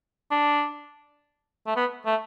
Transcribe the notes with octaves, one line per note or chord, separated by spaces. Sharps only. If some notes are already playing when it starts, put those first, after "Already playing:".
D4
A3
B3
A3